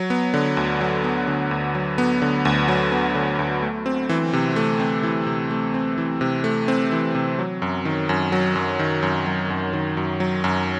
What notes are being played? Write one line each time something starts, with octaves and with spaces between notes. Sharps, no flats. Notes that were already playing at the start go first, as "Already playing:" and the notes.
Already playing: F#3
B3
D3
D2
F#3
B3
D3
D2
F#3
B3
D3
D2
F#3
B3
D3
D2
A3
C4
E3
C3
A3
C4
E3
C3
A3
C4
E3
C3
A3
C4
E3
C3
F#3
F#2
D#3
F#2
F#3
F#2
D#3
F#2
F#3
F#2
D#3
F#2
F#3
F#2